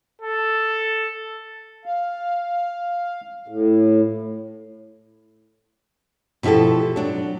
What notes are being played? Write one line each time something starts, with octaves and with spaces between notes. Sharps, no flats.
A4
F5
A2
B2 F3 E4 G4 A4
F#3 D4